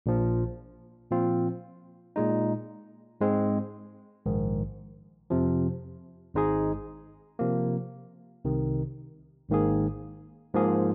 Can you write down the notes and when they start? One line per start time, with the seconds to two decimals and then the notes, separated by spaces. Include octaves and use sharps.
0.06 A#1 A#2 F3
1.11 A#2 F3 C4 F4
2.16 A#2 G#3 D#4
3.21 G#2 G#3 C4
4.25 A#1 G#2 D#3
5.30 F2 C3 F3
6.34 G#1 G#2 G#3 D#4 G#4
7.39 C3 F3 A#3
8.45 C2 C3 D#3
9.49 G#1 G#2 D#3 A#3 G#4
10.54 G#2 F3 A#3 G#4